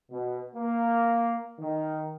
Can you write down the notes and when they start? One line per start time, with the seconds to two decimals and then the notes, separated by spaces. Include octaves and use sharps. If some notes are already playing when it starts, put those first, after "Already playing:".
0.12 B2
0.56 A#3
1.60 D#3